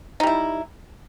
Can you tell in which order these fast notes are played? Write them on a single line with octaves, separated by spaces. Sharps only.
D#4 G3 E4